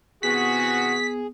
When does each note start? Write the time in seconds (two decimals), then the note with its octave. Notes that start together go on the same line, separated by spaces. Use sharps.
0.23 C3 E3 B3 F#4 G#4 B6